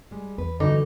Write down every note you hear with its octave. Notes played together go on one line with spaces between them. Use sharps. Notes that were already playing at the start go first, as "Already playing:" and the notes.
G3 G#3
E2 B4
G2 D3 E3 D#4 F#4 A4 D6